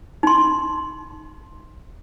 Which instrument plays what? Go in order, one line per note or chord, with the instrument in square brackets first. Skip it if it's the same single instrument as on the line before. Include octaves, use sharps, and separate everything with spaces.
[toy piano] D#4 C6